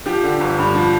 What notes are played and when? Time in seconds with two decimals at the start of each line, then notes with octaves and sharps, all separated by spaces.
0.06 F3 G4
0.23 D3
0.40 G1
0.59 G2
0.75 F3